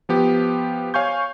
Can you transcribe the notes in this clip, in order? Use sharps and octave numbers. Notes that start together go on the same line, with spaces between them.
F3 B3 G4
C#5 F5 G#5 C#6 G6